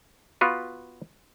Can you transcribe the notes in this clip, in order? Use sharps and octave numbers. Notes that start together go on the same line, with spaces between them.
B3 F4 F#4 B4